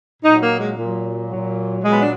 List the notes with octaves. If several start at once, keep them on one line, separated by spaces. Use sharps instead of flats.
A#2 F#3 D#4
A#3
G#3
A#2 F#3
A#2 F#3
A#2 F#3 G#3
B3
D4